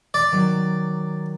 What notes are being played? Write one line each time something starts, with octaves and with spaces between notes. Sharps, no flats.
D5
D#3 F#3 C#5